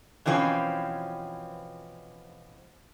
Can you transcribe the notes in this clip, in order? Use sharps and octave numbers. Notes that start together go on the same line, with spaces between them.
B2 E3 F3 C4 C#4